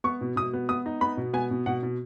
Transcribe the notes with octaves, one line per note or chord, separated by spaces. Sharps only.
B3 C#6
B2
B2 D#6
B3
B3 D#6
D#4
B3 B5
B2
B3 G#5
B2
B2 F#5
B2